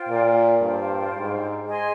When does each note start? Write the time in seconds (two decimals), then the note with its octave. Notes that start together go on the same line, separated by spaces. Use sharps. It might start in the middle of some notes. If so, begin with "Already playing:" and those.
Already playing: F4 C5 G5
0.09 A#2
0.61 G2 F4 C5 G5
1.14 G#2
1.67 G#4 D#5 G#5 C6